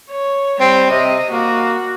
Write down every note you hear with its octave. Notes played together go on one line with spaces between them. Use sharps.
C#5
G3 C4
C3 D#5
A#3 F#4